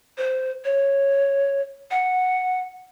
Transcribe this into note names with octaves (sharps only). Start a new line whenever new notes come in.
C5
C#5
F#5